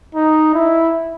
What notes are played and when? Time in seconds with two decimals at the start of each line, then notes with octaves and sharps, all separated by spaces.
0.15 D#4
0.54 E4